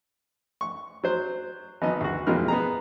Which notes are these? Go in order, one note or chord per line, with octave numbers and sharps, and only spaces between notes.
C#6
F#3 C5
G#1 B3 D#4 D#5
D2 F#4
F2 B2 E3 G#3 A#4 F6
B3 G#4 A#5